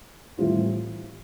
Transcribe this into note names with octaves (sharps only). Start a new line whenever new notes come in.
A2 E3 G3 C4 F4